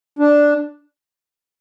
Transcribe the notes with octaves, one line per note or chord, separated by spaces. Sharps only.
D4